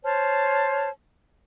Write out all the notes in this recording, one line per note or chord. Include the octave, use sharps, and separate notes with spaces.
C5 C#5 A5 F6